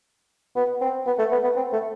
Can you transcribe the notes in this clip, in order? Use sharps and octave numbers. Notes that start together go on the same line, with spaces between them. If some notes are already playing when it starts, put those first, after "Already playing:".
B3
C4
B3
A3
B3
B3
C4
A3